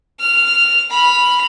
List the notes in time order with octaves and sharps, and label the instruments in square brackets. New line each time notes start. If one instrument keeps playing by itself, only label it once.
[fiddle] F6
B5 F6